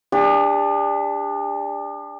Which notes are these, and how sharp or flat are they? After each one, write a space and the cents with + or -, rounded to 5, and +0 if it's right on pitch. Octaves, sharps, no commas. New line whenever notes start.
D4 +0 G4 +45